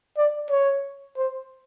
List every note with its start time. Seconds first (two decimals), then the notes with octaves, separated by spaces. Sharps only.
0.17 D5
0.50 C#5
1.17 C5